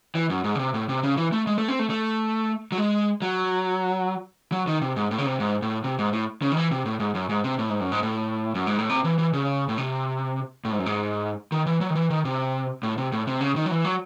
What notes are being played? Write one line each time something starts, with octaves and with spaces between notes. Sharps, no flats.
E3
F#2
G#2
C#3
C3
A2
C3
C#3
E3
A3
G#3
A3
C4
A3
A3
F#3
G#3
F#3
F#3
D#3
C3
G#2
A2
C#3
C3
G#2
A2
C3
G#2
A2
C#3
D#3
E3
C3
A2
G#2
F#2
G#2
C3
A2
G#2
F#2
G#2
A2
F#2
G#2
A2
C3
E3
E3
C#3
A2
C3
A2
G#2
F#2
G#2
D#3
E3
F#3
D#3
E3
D#3
C3
A2
C3
A2
C3
C#3
D#3
F#3
E3
F#3